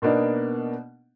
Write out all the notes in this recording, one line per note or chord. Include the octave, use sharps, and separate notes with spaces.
B2 A#3 B3 D4 D#4